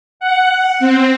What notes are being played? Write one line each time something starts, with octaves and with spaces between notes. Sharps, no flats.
F#5
C4